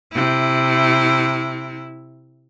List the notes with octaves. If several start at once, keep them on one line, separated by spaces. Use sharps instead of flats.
C3 E4